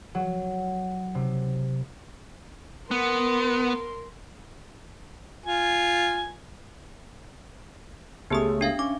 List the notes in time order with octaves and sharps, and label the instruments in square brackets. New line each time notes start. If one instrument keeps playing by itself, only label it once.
[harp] F#3
C3
[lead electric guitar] B3 [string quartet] A#4 C6
[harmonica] F4 G#5
[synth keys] C#2 C#3 A3 [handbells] B3 G4 D#6
[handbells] D4 E5 F5
[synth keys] C#4 [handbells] D6